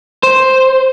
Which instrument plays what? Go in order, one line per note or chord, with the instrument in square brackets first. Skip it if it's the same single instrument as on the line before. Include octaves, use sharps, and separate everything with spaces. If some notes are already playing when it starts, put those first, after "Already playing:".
[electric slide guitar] C5